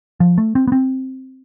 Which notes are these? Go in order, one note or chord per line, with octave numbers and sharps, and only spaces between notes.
F3
A3
C4
B3
C4